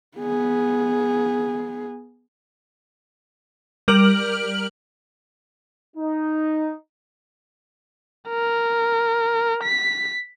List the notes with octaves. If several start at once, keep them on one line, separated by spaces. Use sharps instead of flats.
B3 G#4
G3 A#4 F6 D7 F#7
D#4
A#4
B6